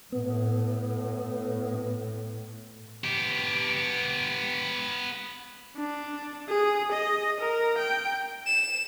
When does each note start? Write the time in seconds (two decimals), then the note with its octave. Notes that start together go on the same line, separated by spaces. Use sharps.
0.12 A2 B3
3.04 B3 G4
5.77 D4
6.49 G#4
6.92 D#5
7.40 A#4
7.79 G5
8.47 E7